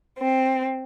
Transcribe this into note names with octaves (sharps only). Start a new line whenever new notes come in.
C4